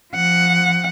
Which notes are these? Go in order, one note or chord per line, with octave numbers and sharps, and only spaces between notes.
F3 F#5